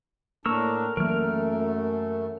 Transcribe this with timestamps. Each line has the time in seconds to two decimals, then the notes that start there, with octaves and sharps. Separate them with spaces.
0.46 A2 A#3 D4 A#4 C#6 E6
0.97 F#2 E3 F#3 A3 A#3 A#4 F6